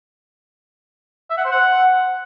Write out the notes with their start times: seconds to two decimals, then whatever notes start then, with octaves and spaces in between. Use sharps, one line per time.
1.30 E5
1.37 F#5
1.44 C5
1.51 F#5